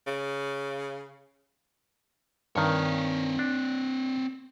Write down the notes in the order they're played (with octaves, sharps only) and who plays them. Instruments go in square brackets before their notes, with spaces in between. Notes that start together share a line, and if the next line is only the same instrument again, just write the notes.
[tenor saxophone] C#3
[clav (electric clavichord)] G2 D#3 [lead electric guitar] C4 C#5
[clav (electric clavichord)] D4